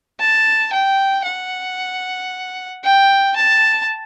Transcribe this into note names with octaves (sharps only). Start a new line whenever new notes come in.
A5
G5
F#5
G5
A5